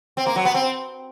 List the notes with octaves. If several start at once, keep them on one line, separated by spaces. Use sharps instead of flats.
C4
A#3
F#3
B3
C4